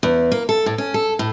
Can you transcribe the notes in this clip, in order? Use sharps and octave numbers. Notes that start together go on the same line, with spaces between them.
E2
A#3
A4
A2
C#4
A4
A2